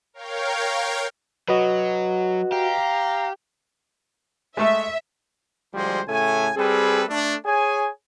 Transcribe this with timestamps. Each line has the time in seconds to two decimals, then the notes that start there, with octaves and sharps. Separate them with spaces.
0.13 A#4 C#5 F5 G5
1.49 F#3 F#4 B4 D#5
2.52 G4 F5 A#5
4.57 G#3 A3 A4 E5
5.74 D2 F3 G3 G#3 C5
6.08 A2 C#3 A3 G#5
6.57 G3 C4 G#4 A4 B4
7.08 A3 D4
7.46 G#4 C#5 G#5